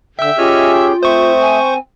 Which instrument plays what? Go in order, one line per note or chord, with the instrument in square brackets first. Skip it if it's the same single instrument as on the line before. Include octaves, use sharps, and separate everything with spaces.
[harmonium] D3 [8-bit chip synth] E5 E6 [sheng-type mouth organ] G5
[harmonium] C#4 G4 G#4 [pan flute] F4 [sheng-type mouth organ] C#5 D#5 F6
[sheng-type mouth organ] G5
[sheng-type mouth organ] A3 D#6 [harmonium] C4 [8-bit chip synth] C5 C#6
[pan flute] G#5